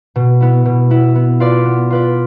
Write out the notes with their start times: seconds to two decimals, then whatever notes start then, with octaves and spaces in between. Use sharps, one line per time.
0.16 B2
0.41 B3 E4
0.65 B2
0.90 B3 E4
1.15 B3
1.40 F4 B4 D5
1.65 B3
1.90 F4 B4 D5